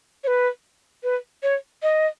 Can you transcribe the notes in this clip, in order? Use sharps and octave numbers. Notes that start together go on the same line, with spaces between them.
C#5
B4
B4
C#5
D#5